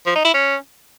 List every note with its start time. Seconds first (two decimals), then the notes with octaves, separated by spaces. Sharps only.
0.06 F3
0.15 D#4
0.25 E4
0.34 C#4